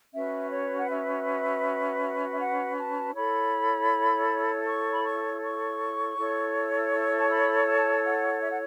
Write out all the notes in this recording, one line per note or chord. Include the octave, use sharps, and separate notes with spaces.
C#4 F#4 B4 E5
C#5
F#5
E5
E5
F#5
A5
E4 A4 C#5 B5
C#6
B5
C#6
C#6
E4 A4 C#5
C#6
A5
B5
A5
F#5
E5
F#5